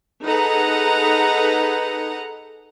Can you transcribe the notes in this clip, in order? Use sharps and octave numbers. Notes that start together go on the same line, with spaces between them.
D#4 G#4 A4 B4 F#5 A#5